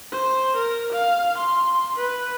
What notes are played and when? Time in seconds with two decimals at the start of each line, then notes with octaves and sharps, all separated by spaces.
0.12 C5
0.56 A#4
0.93 F5
1.38 C6
1.97 B4